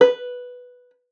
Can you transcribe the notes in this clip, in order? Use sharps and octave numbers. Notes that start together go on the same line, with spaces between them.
B4